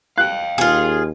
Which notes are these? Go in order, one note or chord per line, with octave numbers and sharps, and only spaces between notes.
F5 G5 F#6
D#2 F4 G#4